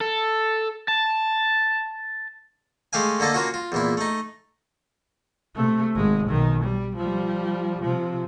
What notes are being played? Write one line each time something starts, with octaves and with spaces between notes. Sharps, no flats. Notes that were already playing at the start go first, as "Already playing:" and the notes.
A4
A5
G#3 A3 G4 F5 G#5
D3 A#3 A4 D#5
A#3 C#4 F4 F#4
F4
E2 A#2 E4
A3 D#4
C3 A3
G#1 G#3
B1 D#3
G3
F3 G3
C3 F3